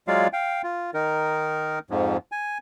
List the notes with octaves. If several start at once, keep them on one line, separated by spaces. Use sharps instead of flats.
F#3 G#3 F4 D5 F5
F5 G5
F4
D#3 D#4 A#4
F2 G#2 F3
G#5